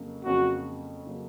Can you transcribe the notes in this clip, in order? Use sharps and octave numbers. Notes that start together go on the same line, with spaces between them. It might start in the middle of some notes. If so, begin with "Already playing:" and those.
Already playing: F2 C#3 F#3 A#3
F2 C#3 F#3 A#3 C#4 F#4
C#3 F#3 A#3 C#4